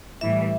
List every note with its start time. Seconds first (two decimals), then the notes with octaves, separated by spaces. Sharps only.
0.21 A2 E3 G3 E5